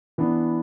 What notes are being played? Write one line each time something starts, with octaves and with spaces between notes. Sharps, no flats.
E3 B3 D4